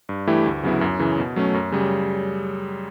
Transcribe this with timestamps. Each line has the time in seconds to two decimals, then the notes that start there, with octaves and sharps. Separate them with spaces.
0.09 G2
0.27 E3 A3 E4 G4
0.46 D2
0.63 C#3 F#3 B3 E4
0.81 F#2
0.99 C#3 E3
1.19 B2
1.36 F#3 A3 C#4
1.54 F#2
1.72 C#3 G3